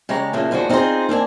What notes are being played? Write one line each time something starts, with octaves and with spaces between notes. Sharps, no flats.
C#3 G#3 G4 C#5 A#5
A#2 C#3 E3 A#3 D4
D#2 F3 G#3 D4 F#4
C4 D#4 F4 G4 G#4 C5
A#3 C4 D4 G#5